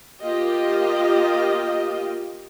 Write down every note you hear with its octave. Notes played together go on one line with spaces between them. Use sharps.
A#3 F4 G4 D#5